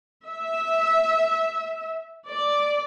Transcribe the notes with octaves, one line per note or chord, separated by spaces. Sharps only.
E5
D5